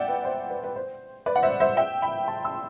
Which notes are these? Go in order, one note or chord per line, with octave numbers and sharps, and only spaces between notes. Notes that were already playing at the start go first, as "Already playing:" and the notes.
Already playing: D5 E5 F#5 G5
B4
C5
B4
B4
C5
B4 D5
F#5
C5 E5
C5 E5
E5 G5
G5 B5
A5 C6
C6 E6